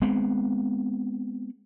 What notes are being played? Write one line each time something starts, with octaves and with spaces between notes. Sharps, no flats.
G#3 B3 C4